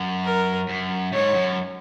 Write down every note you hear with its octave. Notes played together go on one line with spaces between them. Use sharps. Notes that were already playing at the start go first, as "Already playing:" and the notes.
Already playing: F#2
A#4
F#2
G#2 C#5
F#2